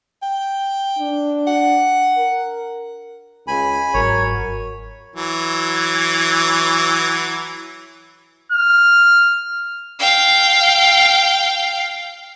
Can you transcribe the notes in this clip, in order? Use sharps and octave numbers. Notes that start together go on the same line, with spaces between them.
G5
D4
F#5
A#4
C#2 G#3 G#5 B5
G1 G#2 F#3 A#4 C#5
E3 F#3
F6
F5 G5